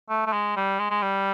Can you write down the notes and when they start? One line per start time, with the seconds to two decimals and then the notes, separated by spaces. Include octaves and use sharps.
0.10 A3
0.26 A3
0.33 G#3
0.56 G3
0.79 G#3
0.91 G#3
1.02 G3